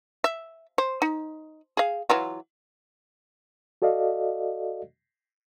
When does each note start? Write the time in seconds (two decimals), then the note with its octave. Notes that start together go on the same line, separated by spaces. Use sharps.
0.24 E5
0.78 C5
1.02 D#4
1.77 G#4 F5
2.10 E3 F#3 F4
3.82 F#4 A4 D5 D#5 F5